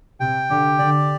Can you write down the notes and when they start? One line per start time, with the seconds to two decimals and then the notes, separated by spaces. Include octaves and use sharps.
0.20 C3 G5
0.50 D3 G4
0.79 D3 D5